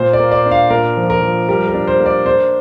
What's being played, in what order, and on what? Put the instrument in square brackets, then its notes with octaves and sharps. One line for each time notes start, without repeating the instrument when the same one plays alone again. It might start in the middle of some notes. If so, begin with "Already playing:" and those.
Already playing: [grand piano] A#2 C5
D5
A#3
D5
D4
F5
A#2 A#4
F3
A#4
F3
G3 A#4
A#4
D4
C5
A#3
D5
D4 C5